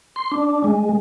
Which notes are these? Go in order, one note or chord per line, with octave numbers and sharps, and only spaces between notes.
C6
D4
G#3